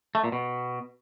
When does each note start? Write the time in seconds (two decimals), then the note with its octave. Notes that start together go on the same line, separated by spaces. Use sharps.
0.15 A3
0.24 A#2
0.32 B2